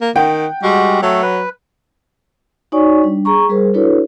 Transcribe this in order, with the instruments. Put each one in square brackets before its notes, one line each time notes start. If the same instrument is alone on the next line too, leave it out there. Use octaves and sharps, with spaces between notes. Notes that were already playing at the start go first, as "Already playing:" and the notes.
[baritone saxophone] A#3
[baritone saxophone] D#3 [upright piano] F#5 G5
[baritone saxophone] G3 [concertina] G#3 F#4
[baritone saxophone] F#3 [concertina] A3 A4
[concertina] B4
[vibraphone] D#4 F#4 C#5 D5 G#5 C#6
G3 D4
G#4 A#5 C#6
G3 G#4 A#4 C5
D4 E4 F#4 A4 B4 C#5